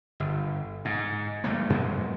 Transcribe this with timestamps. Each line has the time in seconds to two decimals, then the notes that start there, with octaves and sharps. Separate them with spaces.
0.20 G1
0.85 G#2
1.44 E2 G3 A3 A#3
1.70 F#2 B2 F#3 G#3